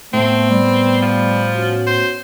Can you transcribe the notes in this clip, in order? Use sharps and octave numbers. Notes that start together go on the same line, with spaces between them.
A2 A3 B3 C4
G3
F3
B3 C#4 F#4
C5